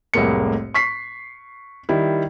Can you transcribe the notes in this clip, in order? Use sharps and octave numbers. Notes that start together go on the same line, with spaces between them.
F1 C2 A2 G#3 A#3 C#7
C#6 B6 C7
D#3 G3 E4